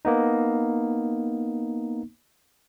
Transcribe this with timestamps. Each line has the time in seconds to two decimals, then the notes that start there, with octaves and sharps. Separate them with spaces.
0.05 A#3 B3 D#4